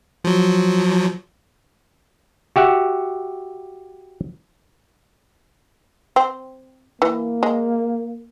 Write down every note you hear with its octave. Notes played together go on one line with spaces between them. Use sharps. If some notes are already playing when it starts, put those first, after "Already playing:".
F3 F#3
F#4 G4 E5 F#5
C4
E3 A#3
G#3